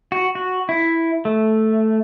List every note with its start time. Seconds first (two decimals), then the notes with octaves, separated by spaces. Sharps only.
0.12 F#4
0.35 F#4
0.69 E4
1.25 A3